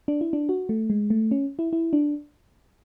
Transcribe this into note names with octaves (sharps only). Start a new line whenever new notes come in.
D4
E4
D4
F#4
A3
G#3
A3
C#4
E4
E4
D4